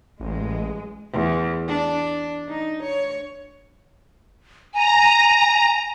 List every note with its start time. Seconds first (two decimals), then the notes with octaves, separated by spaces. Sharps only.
0.20 A1 G#3
1.12 E2
1.68 D4
2.49 D#4
2.83 C#5
4.74 G#5 A#5